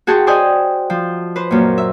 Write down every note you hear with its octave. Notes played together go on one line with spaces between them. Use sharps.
F#4 G#4 G5 A5 C6 C#6
C5 D5 D#5 G5 G#5
F3
B4 C5
F#2 A#2
E5